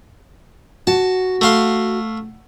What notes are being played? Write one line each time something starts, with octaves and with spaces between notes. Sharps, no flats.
F#4 A5
A3 F5 C6